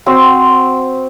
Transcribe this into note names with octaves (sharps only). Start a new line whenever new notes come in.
C4 F#4 C6